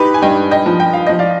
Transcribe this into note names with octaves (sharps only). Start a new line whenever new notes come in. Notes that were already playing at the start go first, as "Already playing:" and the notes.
Already playing: D#4 G4 B4
G#5
G2 D#5 G5
D#5 G5
F3
G5
F5
F3 D#5
D5 F5